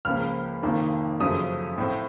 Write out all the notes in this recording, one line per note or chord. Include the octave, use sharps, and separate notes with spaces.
C#2 C#3 F3 A#3 F6
F1 F2 D#3 A#3
F#2 C#3 F3 A3 D#6
A2 A3 C4